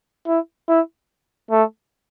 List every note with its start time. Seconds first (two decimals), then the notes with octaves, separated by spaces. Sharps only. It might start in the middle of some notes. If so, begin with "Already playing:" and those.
0.27 E4
0.68 E4
1.51 A3